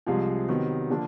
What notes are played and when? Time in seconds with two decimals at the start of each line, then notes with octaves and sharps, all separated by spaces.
0.07 C2 C3 F3 G#3
0.49 C3 D#3 F#3 B3
0.90 D3 F3 A#3 D4